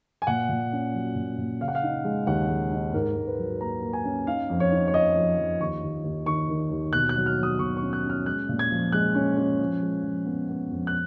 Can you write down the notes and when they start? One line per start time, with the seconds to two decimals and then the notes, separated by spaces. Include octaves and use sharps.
0.22 G#5
0.27 A#2 F#5
0.49 A#2
0.73 C#4
0.94 F#3
1.16 A#2
1.38 A#2
1.61 C#3 F5
1.68 F#5
1.75 F5
1.83 D#4
2.05 G#3
2.27 D#2 F#5
2.49 G#3
2.72 D#4
2.94 G#2 A#4
3.16 G#2
3.27 B4
3.38 F#3
3.60 A#3 A#5
3.82 A#3
3.93 G#5
4.05 C#4
4.27 D#4 F5
4.50 F2
4.60 C#5
4.72 D#4
4.88 C#5
4.93 F3 D#5
5.16 F3
5.38 F3
5.60 D#2 C#6
5.83 D#2
6.04 D#2
6.26 D#3 C#6
6.49 D#3
6.71 D#2
6.93 B2 F#6
7.09 F#6
7.16 F#3
7.26 F6
7.38 F#3 D#6
7.59 B2 C#6
7.77 C#6
7.82 C#4
7.93 F#6
8.04 C#4
8.09 F6
8.26 G#3 F#6
8.49 A#2
8.59 G#6
8.71 F3
8.92 G#3 F#6
9.15 C#4
9.37 C#4
9.60 F3
9.82 G#3
10.04 F3
10.25 B3
10.49 B3
10.71 F2
10.87 F#6